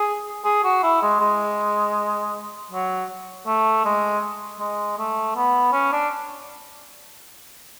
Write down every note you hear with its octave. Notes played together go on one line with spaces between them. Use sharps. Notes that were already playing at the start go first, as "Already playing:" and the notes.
Already playing: G#4
G#4
F#4
E4
G#3
G#3
F#3
A3
G#3
G#3
A3
B3
C#4
D4